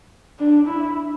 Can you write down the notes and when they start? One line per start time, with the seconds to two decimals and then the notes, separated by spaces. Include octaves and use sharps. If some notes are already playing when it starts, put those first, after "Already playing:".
0.39 D4
0.68 E4